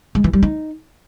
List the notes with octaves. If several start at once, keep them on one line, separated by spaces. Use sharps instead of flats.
G#3
E3
G3
D#4